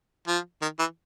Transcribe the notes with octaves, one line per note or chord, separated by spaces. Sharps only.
F3
D#3
E3